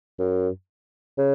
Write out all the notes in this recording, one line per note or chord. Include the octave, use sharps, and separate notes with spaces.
F#2
C#3